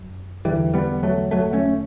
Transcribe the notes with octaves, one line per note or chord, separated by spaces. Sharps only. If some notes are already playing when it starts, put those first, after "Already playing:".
Already playing: F#2
E2 D3 E3 G3
G3 B3
F#3 A3
F#3 A3
A3 C#4